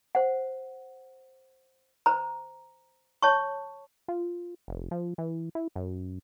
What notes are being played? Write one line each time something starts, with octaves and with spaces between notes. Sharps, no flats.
C5 F#5
C5 A#5
C#5 A5 C#6
F4
F1
F3
E3
E4
F#2